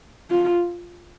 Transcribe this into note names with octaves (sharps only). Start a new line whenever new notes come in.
F4